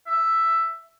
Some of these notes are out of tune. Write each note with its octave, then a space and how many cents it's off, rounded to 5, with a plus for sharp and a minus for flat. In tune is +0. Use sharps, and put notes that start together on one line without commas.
E5 +5